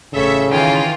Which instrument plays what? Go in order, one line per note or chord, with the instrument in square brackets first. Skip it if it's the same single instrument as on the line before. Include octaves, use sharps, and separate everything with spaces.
[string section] A1 E5 [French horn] C#3 [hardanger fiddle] A4 C#5
[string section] D#3 E3 F4 [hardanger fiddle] G5 G#5